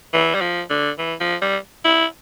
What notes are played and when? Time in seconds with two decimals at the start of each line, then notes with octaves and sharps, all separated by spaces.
0.13 E3
0.34 G3
0.41 F3
0.70 D3
0.98 E3
1.20 F3
1.42 G3
1.84 E4